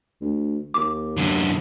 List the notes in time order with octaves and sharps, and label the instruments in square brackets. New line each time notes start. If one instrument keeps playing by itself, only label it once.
[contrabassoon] D2
[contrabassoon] D#2 [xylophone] D6
[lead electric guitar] F#2 D3